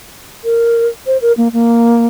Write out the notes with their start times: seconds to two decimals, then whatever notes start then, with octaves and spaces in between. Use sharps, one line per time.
0.44 A#4
1.07 C5
1.22 A#4
1.37 A#3
1.53 A#3